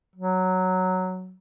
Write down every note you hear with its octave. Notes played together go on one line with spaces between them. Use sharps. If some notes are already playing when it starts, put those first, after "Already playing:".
F#3